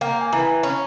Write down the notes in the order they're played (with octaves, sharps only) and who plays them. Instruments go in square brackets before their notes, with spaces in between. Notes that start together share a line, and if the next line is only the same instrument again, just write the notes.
[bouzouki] A#3 [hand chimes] G5
[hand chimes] G#5
[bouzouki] E3 [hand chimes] A#5
[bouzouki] C#4